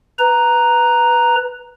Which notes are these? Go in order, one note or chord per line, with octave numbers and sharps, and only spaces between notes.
B4 A#5